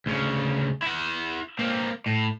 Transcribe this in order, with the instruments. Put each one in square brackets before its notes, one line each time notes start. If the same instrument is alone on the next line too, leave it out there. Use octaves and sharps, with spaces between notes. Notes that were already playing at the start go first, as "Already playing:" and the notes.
[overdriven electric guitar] D2 C#3
E4 F#5
A#3 C4
A2